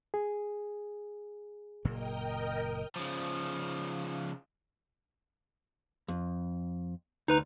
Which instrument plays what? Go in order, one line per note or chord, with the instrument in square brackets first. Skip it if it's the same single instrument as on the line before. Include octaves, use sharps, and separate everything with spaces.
[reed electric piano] G#4
[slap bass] F#1 A#2 A#3 [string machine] A#4 D#5 G5
[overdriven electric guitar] C#3 F3
[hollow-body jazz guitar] F2
[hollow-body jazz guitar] D2 [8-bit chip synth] D#4 B4 A#5